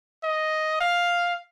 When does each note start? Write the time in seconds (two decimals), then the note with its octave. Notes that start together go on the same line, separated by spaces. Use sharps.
0.24 D#5
0.81 F5